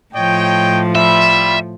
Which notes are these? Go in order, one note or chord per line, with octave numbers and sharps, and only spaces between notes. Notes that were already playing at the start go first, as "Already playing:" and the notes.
A2 F3 C#5 D#5 G5
G3 F4 E5 B5